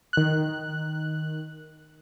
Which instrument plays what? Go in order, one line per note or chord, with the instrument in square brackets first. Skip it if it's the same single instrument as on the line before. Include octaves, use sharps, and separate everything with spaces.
[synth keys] D#3 F#6